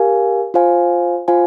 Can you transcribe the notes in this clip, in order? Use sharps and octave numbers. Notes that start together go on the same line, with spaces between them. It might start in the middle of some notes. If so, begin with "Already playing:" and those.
Already playing: G4 A#4 F5 G#5
F4 C5 F5 G#5
F4 C5 F5 G#5